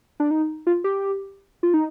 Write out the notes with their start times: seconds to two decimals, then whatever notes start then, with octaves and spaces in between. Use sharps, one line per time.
0.20 D4
0.31 D#4
0.67 F4
0.84 G4
1.63 F4
1.74 D#4